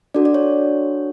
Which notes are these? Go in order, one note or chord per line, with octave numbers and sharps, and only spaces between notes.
D4 F#4 A4 D5
D5
C#5